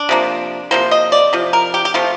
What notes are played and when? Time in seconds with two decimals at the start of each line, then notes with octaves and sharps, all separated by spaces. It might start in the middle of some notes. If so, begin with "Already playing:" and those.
Already playing: D4
0.09 C3 F3 A#3
0.71 C3 F3 A#3 C5
0.91 D#5
1.12 D5
1.33 C3 F3
1.53 A#4
1.74 G4
1.85 G4
1.94 C3 F3 A3 F4